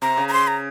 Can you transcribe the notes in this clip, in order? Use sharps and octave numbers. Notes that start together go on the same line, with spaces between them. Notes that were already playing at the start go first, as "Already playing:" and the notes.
C3 A#5
C#3
A#5
C6
A#5